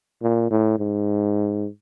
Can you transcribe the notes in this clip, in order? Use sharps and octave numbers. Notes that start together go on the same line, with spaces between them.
A#2
A2
G#2